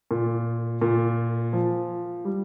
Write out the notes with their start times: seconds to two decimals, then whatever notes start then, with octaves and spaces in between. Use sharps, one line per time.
0.11 A#2
0.82 A#2
1.53 F3
2.25 G3